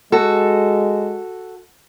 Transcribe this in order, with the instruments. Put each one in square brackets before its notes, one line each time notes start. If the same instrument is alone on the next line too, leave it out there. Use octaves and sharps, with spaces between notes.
[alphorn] G#3 [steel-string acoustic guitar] F#4 A4